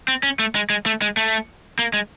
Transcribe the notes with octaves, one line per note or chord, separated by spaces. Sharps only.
C4
C#4
A3
G#3
G#3
A3
G#3
A3
A#3
G#3